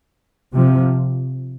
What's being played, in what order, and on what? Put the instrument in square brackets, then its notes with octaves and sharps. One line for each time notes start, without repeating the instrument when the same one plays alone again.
[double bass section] C3 F3